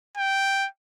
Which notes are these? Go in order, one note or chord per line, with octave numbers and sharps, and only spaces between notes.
G5